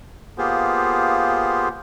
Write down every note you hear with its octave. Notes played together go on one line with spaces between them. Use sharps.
A#3 B3 F4 G4 G#4 C5